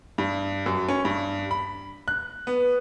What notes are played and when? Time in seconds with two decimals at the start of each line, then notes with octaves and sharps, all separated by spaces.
0.18 G2
0.66 F#2
0.88 C#4
1.05 G2
1.51 B5
2.08 F#6
2.47 B3